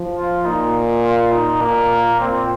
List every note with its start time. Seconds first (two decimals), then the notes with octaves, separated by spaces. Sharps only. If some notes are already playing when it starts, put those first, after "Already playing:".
Already playing: F3
0.16 F4
0.45 A#2 D#4
1.04 F4
1.32 D#4
1.61 A#2 A#3
2.20 A#2 C4